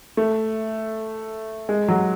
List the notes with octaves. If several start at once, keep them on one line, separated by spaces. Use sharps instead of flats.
A3
G#3
F#3